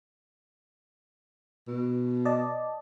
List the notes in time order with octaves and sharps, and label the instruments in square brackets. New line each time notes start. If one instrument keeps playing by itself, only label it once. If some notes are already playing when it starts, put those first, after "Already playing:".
[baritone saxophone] B2
[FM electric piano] D5 D#5 A5